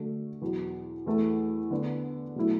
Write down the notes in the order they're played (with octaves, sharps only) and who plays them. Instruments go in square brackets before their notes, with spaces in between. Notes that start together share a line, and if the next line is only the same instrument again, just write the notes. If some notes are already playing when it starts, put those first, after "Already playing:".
Already playing: [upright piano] D3 A3 D4 F#4 A4
E2 B2 F#3
E2 E3 A3
D3 B3 D4
B2 F#3 A3 E4